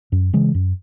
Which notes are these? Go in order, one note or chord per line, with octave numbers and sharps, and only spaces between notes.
F#2
C#3 E3 G#3
F#2